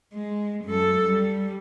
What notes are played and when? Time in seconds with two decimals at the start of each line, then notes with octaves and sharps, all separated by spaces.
0.14 G#3
0.66 F#2 A4
1.06 G3